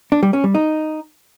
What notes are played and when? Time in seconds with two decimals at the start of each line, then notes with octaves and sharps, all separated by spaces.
0.12 D4
0.23 G3
0.33 C#4
0.44 G3
0.55 D#4